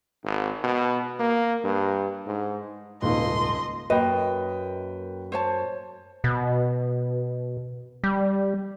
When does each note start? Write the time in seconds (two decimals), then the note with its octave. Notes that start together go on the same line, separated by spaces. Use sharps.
0.24 G#1
0.64 B2
1.19 A#3
1.64 G2
2.26 G#2
3.02 D#1 G#1 C#2 D#5 C6
3.90 F#2 A#3 B4 D#5 G5
5.32 C5 C#5 A5
6.24 B2
8.04 G3